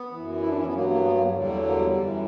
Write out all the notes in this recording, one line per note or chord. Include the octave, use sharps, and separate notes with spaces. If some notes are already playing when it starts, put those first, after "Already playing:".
Already playing: B3
E3
F#2
E4
D4
C#4
B3
G2 F#3 A#3
A#3
B3
A#3
F#3
E2 D3 F#3 G3
A#3
G3
G3
F#2 E3